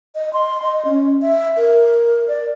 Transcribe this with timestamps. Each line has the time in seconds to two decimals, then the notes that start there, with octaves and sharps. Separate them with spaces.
0.15 D#5
0.33 C6
0.62 D#5
0.85 C#4
1.22 E5
1.57 A#4
2.28 D5